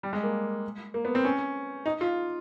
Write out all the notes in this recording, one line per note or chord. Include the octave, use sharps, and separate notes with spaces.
G3
G#3
A#3
A#3
B3
C4
C#4
D#4
F4